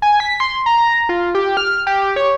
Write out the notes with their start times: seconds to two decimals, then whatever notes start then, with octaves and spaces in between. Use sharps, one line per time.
0.02 G#5
0.20 B6
0.40 C6
0.66 A#5
1.09 F4
1.35 G4
1.57 F6
1.87 G4
2.02 G4
2.16 C#5